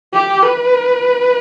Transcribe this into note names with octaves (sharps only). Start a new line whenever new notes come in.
G4
B4